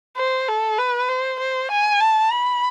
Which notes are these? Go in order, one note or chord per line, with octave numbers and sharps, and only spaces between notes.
C5
A4
B4
C5
C5
G#5
A5
B5